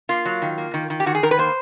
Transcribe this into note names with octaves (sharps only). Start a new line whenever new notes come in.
A#3 F4
F#3
D#3
A#3
D#3
D#3
G4
D#3 F#4
G#4
D#3 A#4
B4
A#3 C5